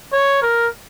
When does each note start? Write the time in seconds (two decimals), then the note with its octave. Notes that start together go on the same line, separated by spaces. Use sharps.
0.13 C#5
0.42 A#4